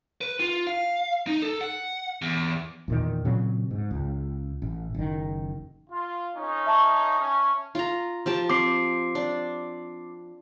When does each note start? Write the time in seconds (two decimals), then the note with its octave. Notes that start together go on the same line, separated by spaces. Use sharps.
0.21 B4
0.40 F4
0.67 F5
1.27 D#4
1.42 A4
1.61 F#5
2.22 E2
2.88 E2 A#2 D#3
3.25 A#2 C#3 F#3 C4
3.71 G#2
3.91 C#2
4.62 A1
4.94 F#1 D#3
5.90 F4
6.36 F2 C#4 D#4
6.66 E5 A5 C#6
7.19 C#4
7.75 F4 A#5
8.26 F3 G4 A5
8.49 C4 D6 C7
9.15 D4